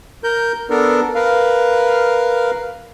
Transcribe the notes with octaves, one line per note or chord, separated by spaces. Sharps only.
A#4 G6
B3 D4 A4 A#4
A#4 B4 F5